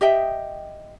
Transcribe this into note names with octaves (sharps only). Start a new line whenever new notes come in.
G4 D#5 E5 G5